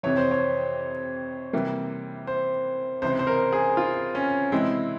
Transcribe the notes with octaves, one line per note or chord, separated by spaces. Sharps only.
F2 C3 E3 C#5
C5
C#5
C3 E3 G3 A#3
C5
C#2 C3 E3 C5
C5
A#4
G#4
F4
C#4
C3 E3 G#3 C4 E4